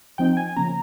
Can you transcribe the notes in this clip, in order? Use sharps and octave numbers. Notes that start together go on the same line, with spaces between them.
F3 C4 D#4 G5
G#5
C#3 F3 A#3 C#4 A#5